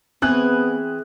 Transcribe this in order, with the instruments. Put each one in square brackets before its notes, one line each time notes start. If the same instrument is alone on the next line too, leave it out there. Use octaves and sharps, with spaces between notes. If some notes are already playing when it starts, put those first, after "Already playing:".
[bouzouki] E3 G#4 [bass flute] B3 [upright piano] C4 F#6